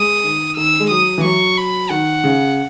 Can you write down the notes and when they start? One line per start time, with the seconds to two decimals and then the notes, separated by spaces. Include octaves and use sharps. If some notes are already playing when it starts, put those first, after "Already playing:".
Already playing: G#3 D#6
0.24 D#3
0.57 D#3 E6
0.80 G#3
0.90 F#3 D#6
1.18 E3
1.24 F#3 C#6
1.57 B5
1.90 D#3 F#5
2.24 C#3